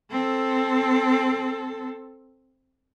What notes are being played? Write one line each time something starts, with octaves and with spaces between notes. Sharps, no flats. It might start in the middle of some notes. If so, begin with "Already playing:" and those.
C4 A4